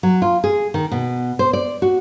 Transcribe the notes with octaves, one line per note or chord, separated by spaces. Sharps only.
F#3
F4
G#4
D#3
B2
C5
D5
F#4